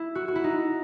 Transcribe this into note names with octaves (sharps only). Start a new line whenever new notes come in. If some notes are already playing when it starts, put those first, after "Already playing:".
Already playing: E4
F#4
F#4
E4
D#4